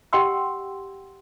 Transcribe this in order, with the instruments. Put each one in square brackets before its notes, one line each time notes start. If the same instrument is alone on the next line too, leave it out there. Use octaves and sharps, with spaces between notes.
[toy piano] G4 D#5 F#5 G5 C6 E6